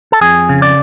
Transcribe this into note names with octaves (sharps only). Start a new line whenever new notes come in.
A4
F2 G#4
C#3
D5